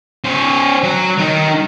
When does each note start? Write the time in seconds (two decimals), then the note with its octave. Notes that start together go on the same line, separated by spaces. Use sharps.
0.24 C#4 C5
0.84 F#3
1.18 D#3 D#4